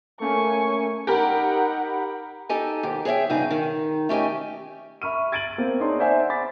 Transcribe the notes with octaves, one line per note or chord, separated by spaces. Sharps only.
A3 A#3 C#4 G#5 C#6
D#4 G4 A#4 F#5 B5
D#4 G4 A4 D#5 G#5
D#2 G#2 G4
G#4 C#5 D#5 E5 G5
E2 G2 C#3 D#4 G#4
D#3
A3 C#4 G4 D#5 G#5
E5 B5 C#6 F6 D#7
G#6 A6 D7 D#7 F#7
A#3 C4
D4 D#4 G#4 C#5 C6
C5 D5 E5 F#5 G#5
B5 D6 A6 B6